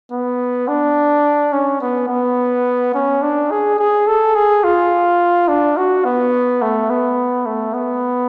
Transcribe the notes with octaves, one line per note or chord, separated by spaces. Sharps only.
B3
D4
C#4
B3
B3
C#4
D4
G#4
G#4
A4
G#4
F4
D4
F#4
B3
A3
B3
A3
B3